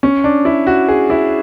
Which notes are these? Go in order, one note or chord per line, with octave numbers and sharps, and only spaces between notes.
C#4
D4
E4
F#4
G#4
E4